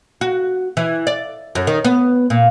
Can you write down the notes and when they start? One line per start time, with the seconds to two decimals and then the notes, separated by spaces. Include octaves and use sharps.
0.21 F#4
0.77 E3
1.07 D5
1.55 F#2
1.67 D#3
1.84 B3
2.30 A#2